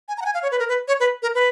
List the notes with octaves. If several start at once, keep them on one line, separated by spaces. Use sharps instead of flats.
G#5
A#5
F#5
G#5
F5
C#5
B4
A#4
B4
C#5
B4
A#4
B4